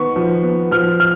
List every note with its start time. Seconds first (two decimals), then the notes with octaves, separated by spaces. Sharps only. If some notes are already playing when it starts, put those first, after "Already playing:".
Already playing: D#3 B3 C#6
0.16 F3
0.43 B3
0.71 F3 F6
1.00 F6